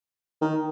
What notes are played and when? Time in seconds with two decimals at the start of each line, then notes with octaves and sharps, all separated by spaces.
0.42 D#3